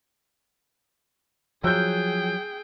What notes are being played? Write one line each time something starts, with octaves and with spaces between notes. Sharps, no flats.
F3 F#3 G#4 G5 E6 F#6 G6